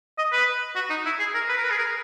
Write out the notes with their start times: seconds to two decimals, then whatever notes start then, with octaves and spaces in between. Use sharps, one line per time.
0.18 D#5
0.32 B4
0.75 F#4
0.90 D#4
1.06 E4
1.19 G#4
1.34 A#4
1.49 B4
1.57 A#4
1.64 B4
1.71 G#4
1.78 A#4